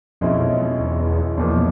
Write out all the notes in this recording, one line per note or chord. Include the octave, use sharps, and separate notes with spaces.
B1 F2 B2 G#3 C#4 E4
E2
B1 E2 A#2 F3